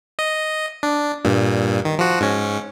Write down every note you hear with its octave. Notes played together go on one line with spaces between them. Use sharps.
D#5
D4
G2 A#2
D#3
F3 F#4
G#2 C#4